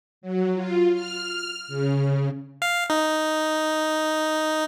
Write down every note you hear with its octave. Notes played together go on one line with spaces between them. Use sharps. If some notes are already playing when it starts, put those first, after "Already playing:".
F#3
F4
F6
C#3
F5
D#4